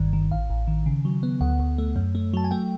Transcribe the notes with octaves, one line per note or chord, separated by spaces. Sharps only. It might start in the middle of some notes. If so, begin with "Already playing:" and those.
Already playing: G1 G2 D#3
D#3
A1 F5
A1
D#3
C#3
F#3
B3
D2 F#5
D2
A3
F#2
A3
F#3 A5
G#5
A3 G5